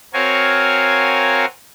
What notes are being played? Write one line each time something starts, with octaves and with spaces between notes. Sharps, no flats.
C4 F#4 A#4 C#5 F5 G#5